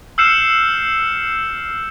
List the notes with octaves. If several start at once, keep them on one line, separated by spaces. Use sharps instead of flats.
E6 F6 G6 C7 C#7 E7